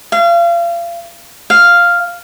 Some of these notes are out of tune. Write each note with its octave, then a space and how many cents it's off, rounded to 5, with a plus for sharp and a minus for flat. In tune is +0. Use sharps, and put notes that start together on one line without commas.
F5 -35
F5 +0